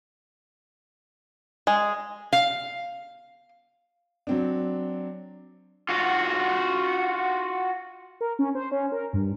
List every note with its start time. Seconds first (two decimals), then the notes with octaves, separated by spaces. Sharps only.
1.67 G#3
2.33 F5
4.27 F#3 C4 D4
5.89 F4 F#4
8.21 A#4
8.39 C#4
8.55 C5
8.72 C#4
8.92 A#4
9.13 G2